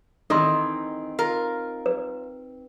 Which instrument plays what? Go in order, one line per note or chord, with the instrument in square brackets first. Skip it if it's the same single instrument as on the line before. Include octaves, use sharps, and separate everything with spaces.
[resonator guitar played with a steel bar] D#3 E3 [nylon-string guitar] C4 D#4 D#5 [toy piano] A4 C6
[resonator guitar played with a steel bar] F4 A#4
[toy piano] B4